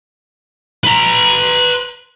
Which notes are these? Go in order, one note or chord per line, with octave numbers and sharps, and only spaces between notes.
B4 A#5